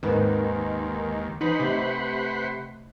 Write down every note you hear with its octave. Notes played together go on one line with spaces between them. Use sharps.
D#2 G#2 D#3 G#3 C4 B4
E3 D#4 B4 C5 F#5
C3 A3 D#4